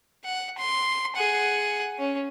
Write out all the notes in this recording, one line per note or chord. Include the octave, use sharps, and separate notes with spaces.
F#5
C6
G#4 F#5
C#4